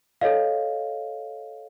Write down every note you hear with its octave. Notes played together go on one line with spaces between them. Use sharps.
A4 C#5 D#5 F5